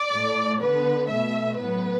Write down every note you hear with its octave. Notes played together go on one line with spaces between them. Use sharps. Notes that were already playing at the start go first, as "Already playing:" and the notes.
Already playing: D5
A2 A3
D3 B3 B4
B2 A3 E5
A2 F#3 B3 B4